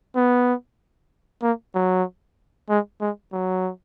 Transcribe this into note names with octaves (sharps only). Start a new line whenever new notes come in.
B3
A#3
F#3
G#3
G#3
F#3